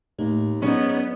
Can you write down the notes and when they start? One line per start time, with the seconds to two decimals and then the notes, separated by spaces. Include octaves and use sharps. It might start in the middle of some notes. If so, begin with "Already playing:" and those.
0.19 D#2 A2 A3 D#4
0.62 G#2 F#3 B3 C#4 D#4